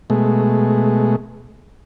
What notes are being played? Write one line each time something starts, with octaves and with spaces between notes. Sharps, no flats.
B2 G#3 A3